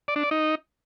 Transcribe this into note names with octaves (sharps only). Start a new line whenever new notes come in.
D5
D4
D5
D#4